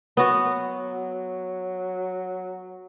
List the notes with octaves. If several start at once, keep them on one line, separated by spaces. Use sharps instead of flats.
F#3 B3 F#4